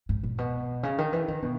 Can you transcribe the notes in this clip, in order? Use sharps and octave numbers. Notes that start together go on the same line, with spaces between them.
G#2
A#2
B2
C#3
D#3
E3
D#3
B2